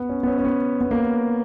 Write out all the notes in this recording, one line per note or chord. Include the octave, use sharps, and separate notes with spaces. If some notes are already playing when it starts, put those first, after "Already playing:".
Already playing: B3
C#4
B3
C#4
C#4
B3
B3
A#3